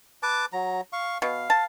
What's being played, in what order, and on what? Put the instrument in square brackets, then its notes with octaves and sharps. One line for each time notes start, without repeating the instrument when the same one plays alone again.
[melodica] B4 A5 D6
F#3 A#5
F5 C#6
[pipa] B2 [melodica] F5
[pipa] A5